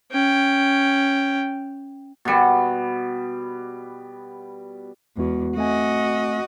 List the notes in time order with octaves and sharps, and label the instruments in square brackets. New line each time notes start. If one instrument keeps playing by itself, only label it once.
[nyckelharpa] C#4 G5
[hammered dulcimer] B2 G3
[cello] E2 [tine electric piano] G#3 B3 F#4
[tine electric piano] A3 C4 G#5 [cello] F#4 D#5